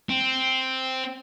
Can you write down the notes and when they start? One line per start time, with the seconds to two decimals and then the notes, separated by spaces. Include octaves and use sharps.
0.09 C4